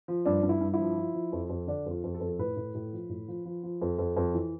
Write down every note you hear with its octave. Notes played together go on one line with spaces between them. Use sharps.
F3
G2 D4
G2
E4
G2
E4
F3
F3
F3
F2
F2
D3 D4
F2 F4
F2
A4
F2
A4
A2 B4
A2
A2
F3
A2
F3
F3
F3
F2
F2
F2
E3